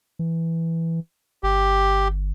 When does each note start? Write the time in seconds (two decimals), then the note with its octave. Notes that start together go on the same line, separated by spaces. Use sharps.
0.19 E3
1.43 G1 G4